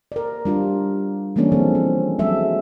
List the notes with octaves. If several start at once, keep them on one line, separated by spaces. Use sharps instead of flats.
A#4 D5
G3 D4 F4
E3 G3 G#3 A#3 C#4 D4
D#3 F3 C4 A4
C4
F#3 G#3 A4 E5